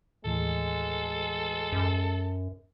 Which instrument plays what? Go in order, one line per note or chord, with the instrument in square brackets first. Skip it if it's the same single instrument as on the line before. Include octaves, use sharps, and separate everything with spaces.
[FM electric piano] D#2 A2 E3 [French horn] G#3 [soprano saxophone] A4
[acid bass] F#2